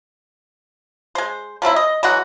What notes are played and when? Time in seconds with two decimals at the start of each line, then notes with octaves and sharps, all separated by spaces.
1.15 G#3 C5
1.62 F3 F#3 C4 E4
1.76 D#5
2.03 E3 F#3 G#3 F#4